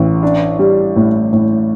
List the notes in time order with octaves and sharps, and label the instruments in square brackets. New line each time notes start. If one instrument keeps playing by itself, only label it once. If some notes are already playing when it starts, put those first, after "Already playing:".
Already playing: [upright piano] A1
D4
G3
A2
A2